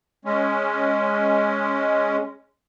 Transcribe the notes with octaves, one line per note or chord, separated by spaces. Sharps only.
G#3 C#4